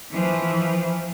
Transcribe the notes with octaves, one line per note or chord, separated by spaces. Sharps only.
E3 F3